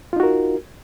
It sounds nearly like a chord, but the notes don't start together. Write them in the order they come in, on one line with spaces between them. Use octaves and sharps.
F4 D#4 F#4 A#4